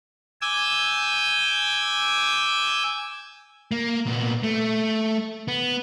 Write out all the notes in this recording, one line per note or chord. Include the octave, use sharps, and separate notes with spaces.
G#5 D6 E6 G6
A#3
A#2 B3
A3
B3